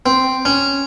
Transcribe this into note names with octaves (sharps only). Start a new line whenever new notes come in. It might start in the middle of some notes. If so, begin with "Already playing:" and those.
C4
C#4